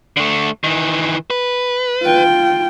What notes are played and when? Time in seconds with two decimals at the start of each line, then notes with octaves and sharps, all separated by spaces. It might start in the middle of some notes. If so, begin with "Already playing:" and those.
0.17 D3 A3
0.64 D#3 E3
1.30 B4
2.02 F4 G5